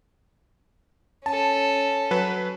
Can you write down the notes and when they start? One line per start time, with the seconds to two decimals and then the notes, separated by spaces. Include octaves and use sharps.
1.26 C#4 A4 A5
2.11 F#3 B4